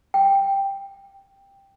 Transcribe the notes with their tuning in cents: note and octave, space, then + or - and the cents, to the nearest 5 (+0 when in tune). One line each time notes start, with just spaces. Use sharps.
G5 +5